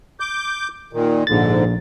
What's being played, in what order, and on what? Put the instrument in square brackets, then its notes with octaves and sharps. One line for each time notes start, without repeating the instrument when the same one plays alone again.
[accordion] D6 G6
A#2 D#3
[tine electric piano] A#1 A6 [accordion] G#2 D3